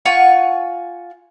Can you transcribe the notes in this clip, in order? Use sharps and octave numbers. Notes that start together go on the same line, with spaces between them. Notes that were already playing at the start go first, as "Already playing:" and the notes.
F4 F#5 G#5 C#6